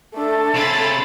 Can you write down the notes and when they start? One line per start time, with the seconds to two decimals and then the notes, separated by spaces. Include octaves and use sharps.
0.13 A3 D4 A4
0.55 C3 G#4 A5 B5 C6 A6